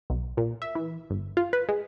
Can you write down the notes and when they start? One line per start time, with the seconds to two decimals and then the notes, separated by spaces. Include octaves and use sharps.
0.10 B1
0.37 A#2
0.62 E5
0.75 E3
1.10 G1
1.37 F4
1.53 B4
1.69 G#3